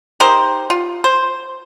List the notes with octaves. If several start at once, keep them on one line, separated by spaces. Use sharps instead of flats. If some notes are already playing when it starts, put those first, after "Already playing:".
D#4 G4 A#4 C5
F4
C5